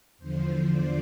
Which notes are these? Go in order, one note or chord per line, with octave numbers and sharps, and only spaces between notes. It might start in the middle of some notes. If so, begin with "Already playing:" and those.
E2 D3 F3 C5
D5